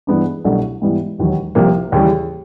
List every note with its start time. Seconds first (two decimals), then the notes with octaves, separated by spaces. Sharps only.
0.07 G2 E3 G#3 B3 D4
0.44 C2 B2 F#3 A3 D4
0.82 G#2 E3 G3 B3
1.18 E1 D#2 D#3 F#3
1.55 C2 C3 F3 A#3
1.92 D#2 C#3 E3 G3